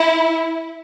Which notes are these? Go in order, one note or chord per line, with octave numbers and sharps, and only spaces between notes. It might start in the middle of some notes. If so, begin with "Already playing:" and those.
Already playing: E4